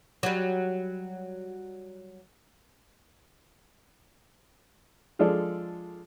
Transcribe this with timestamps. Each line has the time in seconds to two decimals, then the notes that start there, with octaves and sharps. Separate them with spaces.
0.23 F#3 G3
5.19 F3 G#3 D4 A4 D5